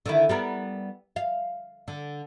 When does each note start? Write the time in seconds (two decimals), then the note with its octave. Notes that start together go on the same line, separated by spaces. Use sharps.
0.06 D3 D#3 E4
0.29 G3 B3 A#4
1.16 F5
1.88 D3